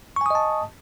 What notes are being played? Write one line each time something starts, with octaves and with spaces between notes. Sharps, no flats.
D#5 G#5 A5 C#6 D#6